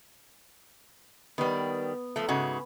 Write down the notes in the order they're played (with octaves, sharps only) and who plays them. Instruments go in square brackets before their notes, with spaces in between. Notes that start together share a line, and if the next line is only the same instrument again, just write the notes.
[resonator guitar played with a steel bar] D#3 G3 [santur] B3
[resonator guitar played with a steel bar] F3 A3
G#2 C#3 F#4